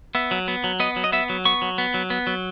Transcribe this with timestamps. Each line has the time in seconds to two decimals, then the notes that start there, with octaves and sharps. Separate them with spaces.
0.15 B3 E5
0.31 F#3
0.48 B3
0.64 F#3
0.80 B3 D#5
0.96 F#3
1.04 D#5
1.12 B3 E5
1.29 F#3
1.45 B3 C#6
1.62 F#3
1.78 B3
1.94 F#3
2.10 B3
2.27 F#3